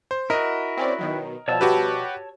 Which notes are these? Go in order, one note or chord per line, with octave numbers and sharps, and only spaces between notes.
C5
E4 F#4 A#4 D#5
C4 C#4 D5
B2 D#3 F#3
B2 F3 G3 C#5 A5 E6
F#4 G4 B4